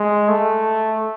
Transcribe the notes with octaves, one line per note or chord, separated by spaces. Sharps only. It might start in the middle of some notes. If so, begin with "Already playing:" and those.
Already playing: G#3
A3